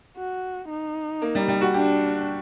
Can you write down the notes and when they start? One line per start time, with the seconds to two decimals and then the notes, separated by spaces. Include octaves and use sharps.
0.17 F#4
0.70 D#4
1.22 A#3
1.35 G3
1.48 G3
1.61 F#4
1.74 D4 G4